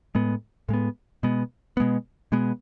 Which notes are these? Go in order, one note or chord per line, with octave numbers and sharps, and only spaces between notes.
A2 G#3 B3
A2 G#3 B3
B2 G#3 B3
B2 G#3 B3
B2 G#3 B3